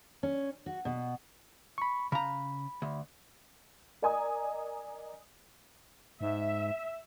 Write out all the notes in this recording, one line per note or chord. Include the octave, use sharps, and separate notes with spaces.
C#4
F#4
B2
B5 C#6
C#3 A#5 B5
D2
A#4 D5 D#5 G#5 A#5 D#6
G#2 E5